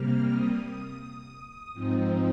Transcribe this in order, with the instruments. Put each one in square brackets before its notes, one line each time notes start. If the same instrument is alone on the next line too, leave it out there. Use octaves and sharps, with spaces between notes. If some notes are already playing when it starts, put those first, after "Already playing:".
Already playing: [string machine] C3 G3 A#3 F6
D#6
D#6
G#2 F3 C4 D#4